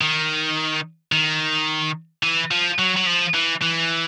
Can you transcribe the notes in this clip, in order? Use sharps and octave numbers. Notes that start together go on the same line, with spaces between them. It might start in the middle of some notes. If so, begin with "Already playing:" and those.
D#3
D#3
E3
F3
F#3
F#3
F3
E3
E3